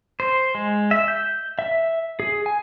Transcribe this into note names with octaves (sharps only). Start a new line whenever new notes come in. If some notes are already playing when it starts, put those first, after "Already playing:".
C5
G#3
E5
G6
E5
G#4
G#5